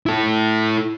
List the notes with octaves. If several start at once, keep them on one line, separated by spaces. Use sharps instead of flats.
E4 A4